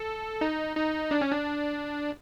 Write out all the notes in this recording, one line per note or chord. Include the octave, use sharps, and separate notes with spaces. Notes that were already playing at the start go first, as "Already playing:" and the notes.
Already playing: A4
D#4
D#4
D4
C#4
D4